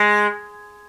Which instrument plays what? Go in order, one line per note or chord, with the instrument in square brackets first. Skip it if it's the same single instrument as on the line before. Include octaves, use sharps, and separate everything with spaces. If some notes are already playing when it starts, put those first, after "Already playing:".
Already playing: [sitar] G#3